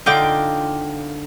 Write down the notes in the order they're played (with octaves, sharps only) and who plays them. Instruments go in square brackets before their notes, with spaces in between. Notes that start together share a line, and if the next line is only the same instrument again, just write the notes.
[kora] D3 D#4 [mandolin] F4 G5 D6